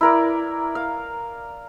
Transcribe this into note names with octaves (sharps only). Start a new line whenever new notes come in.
E4 A#4 D5
F5